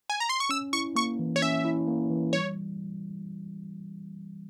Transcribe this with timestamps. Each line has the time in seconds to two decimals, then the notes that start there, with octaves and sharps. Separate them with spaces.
0.10 G#5
0.20 A#5
0.29 C6
0.40 C#6
0.49 C#4 E6
0.73 E4 C#6
0.95 A#3 C#6
1.19 E3
1.36 C#5
1.42 C#4 E5
1.65 E4
1.88 A#3
2.10 E3
2.33 G3 C#5